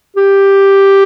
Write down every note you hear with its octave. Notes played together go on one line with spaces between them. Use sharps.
G4